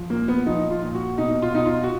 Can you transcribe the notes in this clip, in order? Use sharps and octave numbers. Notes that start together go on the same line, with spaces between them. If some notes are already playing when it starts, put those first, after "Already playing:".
Already playing: F3
A#2 A#3
B3
F3 D#4
F4
A#2
F#4
B2 D#4
F4
B2 D#4
F4
F#4